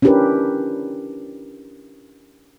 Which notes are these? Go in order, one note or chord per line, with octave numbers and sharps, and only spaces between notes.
C#4 D4 E4 G4 A#4 B4